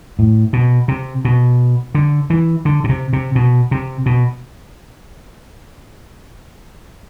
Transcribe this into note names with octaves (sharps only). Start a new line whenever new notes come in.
A2
B2
C3
B2
D3
E3
D3
B2
C3
C3
B2
C3
B2